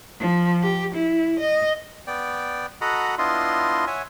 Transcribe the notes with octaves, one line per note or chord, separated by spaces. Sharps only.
F3
G4
E4
D#5
B3 D5 G5
F#4 A4 D#5 F#5 A#5 B5
B3 D4 E4 F4 D#5 C6
C#5 E5 F#5 G#5